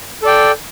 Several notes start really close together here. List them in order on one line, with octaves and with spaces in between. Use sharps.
A4 D5 G5